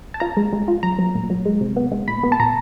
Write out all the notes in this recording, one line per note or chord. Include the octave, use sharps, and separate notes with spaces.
A5
F4 A#5
G#3
G#3
F4
F#3 A#5
F#3
A#2
F#3
G#3
C3
B3
G#3
A#2 B5
B3
A5
A#2 A#5